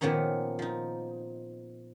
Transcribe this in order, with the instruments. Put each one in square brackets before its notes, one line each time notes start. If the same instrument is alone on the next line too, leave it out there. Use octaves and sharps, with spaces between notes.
[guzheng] A#2 D#3 F3 B3 C#4 D#4
F3 D#4